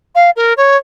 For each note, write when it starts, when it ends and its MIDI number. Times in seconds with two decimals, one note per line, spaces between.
0.15 0.30 77
0.36 0.53 70
0.57 0.77 73